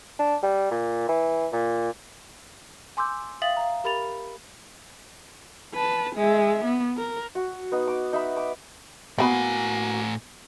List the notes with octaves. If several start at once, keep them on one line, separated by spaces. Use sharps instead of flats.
D4
G3
A#2
E3
A#2
G#5 C6 D6 E6 G6
E5 F5 G5 D#6 A6 F#7
F5 A#5
G4 A#4 B5 A6 F7
B4 A5
G#3 E5
B3
A#4
F#4
B3 D#4
D6
D#4 E5 B5
D6
A2 A#3 B3 F#4 G#5 B5